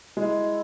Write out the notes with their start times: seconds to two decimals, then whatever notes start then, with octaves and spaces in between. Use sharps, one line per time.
0.17 G#3 E4